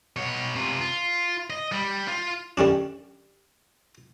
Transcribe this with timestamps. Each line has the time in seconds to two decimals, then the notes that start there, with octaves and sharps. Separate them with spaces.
0.16 B2 C#5
0.55 C3 F4
0.81 F4
1.50 D#5
1.72 G3
2.08 F4
2.57 D3 G3 C#4 D4